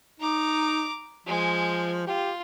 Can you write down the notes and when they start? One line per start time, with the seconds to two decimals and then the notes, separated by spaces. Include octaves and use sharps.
0.20 D#4 A#5 D6
1.27 F3 G#3 G#5
2.07 F4 G4